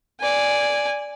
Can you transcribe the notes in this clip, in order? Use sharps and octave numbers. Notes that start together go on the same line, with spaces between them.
D5 G#5